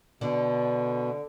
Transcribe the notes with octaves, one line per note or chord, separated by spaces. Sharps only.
B2 D3